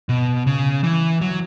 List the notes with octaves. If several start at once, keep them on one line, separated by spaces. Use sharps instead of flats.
B2
C#3
E3
F#3